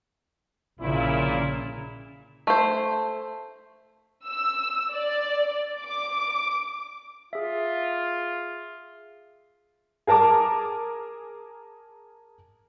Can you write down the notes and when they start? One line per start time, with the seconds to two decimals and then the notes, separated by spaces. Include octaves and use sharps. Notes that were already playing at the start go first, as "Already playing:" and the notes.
0.80 A#1 A#2 C#3 E4
2.47 A3 C5
4.27 E6
4.93 D5
5.82 D6
7.33 F4 G#4 E5
10.07 G#4 A#4 A5 A#5 D6